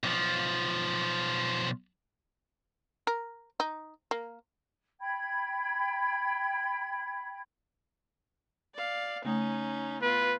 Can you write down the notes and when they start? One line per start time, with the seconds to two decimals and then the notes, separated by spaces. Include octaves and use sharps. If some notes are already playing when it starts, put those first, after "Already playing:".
0.03 B1 F3
3.07 A#4
3.60 D#4
4.11 A#3
5.00 G5 B5 G#6
8.74 D5 F5
9.25 C#3 A3 C#4 D#4 D#6
10.02 B3 F4 B4